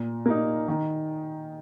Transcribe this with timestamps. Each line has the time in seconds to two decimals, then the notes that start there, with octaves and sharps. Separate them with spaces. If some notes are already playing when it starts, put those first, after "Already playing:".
Already playing: A#2
0.26 A#3 D#4
0.68 D#3